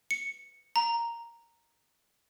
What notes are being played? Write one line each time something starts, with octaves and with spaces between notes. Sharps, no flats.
C#7
A#5